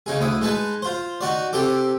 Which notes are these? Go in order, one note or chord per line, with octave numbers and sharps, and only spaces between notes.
C#3 D#4 G#4
D2 E4 D#6
G#3 D#4 B4 A5
F4 C5
D#4 F#4 D5
C3 G4 A4 D6